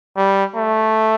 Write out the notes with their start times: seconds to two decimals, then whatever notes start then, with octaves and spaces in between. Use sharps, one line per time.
0.17 G3
0.55 A3